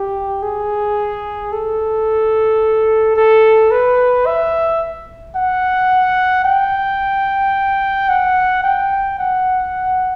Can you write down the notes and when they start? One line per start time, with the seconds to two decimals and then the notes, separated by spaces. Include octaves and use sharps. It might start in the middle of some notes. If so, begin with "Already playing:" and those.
Already playing: G4
0.43 G#4
1.52 A4
3.16 A4
3.71 B4
4.26 E5
5.36 F#5
6.45 G5
8.09 F#5
8.64 G5
9.19 F#5